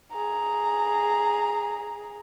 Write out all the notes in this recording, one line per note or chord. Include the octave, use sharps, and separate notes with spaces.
G#4 A#5